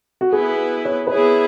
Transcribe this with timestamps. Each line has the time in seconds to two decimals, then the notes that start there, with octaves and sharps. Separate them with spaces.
0.21 F#4
0.32 B3 E4 G#4 B4
0.85 C#5
1.07 B4
1.12 B3 E4 G#4 C#5